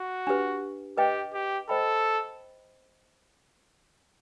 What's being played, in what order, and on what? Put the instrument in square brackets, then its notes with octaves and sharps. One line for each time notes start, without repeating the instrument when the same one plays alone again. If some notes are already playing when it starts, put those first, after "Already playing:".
Already playing: [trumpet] F#4
[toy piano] D4 G4 B4
[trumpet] G4 [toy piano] B4 D#5 G5
[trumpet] G4
[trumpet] A4 [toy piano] C5 D#5 G5 B5